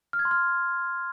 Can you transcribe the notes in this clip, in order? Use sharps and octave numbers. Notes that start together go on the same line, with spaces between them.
F6
G#6
C6
F6